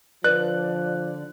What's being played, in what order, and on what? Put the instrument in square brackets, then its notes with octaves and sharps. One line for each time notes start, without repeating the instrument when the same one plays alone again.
[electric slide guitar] D3 D5 [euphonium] F3 [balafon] B4 [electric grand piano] F#6